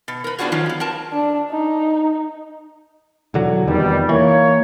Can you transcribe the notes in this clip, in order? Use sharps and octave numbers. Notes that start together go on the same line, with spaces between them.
B2
A#4 B4
B3 C4 D4 F4 F#4 G#4
D#3 F3 F#3 C#4 F4
B3 C4
C4 A#4 A5
D4
D#4
E1 D3 F#3
F1 E2 D#3 G3
E3 A#3 C#5